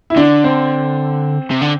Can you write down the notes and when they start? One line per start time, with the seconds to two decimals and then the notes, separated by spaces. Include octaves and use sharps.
0.10 E4
0.16 D3 D4
0.44 C4
1.51 C3
1.62 D3